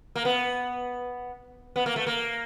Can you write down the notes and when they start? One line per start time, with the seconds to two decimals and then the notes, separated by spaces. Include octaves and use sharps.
0.15 A#3
0.25 B3
1.76 B3
1.86 A#3
1.96 A3
2.06 A#3